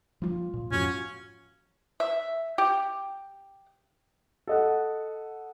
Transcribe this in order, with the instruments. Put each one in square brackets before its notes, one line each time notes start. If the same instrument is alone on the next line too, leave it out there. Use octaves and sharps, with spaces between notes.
[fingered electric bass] F3 G3 [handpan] A#3 F4
[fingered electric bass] A#2
[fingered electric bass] F2 G#2 F3 [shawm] C#4 [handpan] F4 F#4
[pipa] E5
G4
[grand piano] A4 D#5 F#5